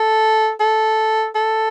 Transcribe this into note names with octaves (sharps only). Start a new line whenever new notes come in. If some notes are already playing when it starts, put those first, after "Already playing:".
Already playing: A4
A4
A4